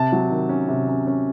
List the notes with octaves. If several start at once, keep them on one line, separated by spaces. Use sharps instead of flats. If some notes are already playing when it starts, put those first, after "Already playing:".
Already playing: C3 A5
F#3
D#3
C#4
C3
C#4
C#4